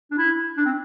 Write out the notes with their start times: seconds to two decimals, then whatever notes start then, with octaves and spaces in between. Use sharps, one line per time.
0.11 D4
0.18 E4
0.57 D4
0.66 C4